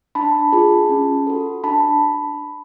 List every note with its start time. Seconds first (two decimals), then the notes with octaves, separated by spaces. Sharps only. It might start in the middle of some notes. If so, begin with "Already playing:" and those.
0.15 D4 A5 B5
0.52 F4 G#4
0.89 C#4
1.27 F#4 A4
1.64 D4 A5 B5